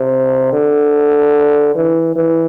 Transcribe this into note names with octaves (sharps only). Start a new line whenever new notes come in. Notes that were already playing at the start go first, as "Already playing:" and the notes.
Already playing: C3
D3
E3
E3